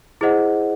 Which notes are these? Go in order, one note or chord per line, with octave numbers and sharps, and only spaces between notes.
E4 G#4 C5 D#5 F#5